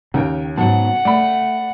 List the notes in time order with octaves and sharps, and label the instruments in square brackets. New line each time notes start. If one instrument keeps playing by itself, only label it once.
[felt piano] D#2 [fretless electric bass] C#3 [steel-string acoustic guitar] A#4 G5
[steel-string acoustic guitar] G#2 F#3 B3 [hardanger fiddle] F#5 [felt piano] A5
[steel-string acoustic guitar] A3 [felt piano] D5 B5